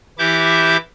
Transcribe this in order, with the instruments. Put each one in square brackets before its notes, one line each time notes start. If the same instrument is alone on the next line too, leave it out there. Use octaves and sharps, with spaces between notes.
[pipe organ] E3 E4 G4 E5 D6 G6